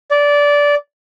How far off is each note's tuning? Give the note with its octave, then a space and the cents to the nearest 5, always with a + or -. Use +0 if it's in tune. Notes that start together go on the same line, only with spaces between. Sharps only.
D5 -15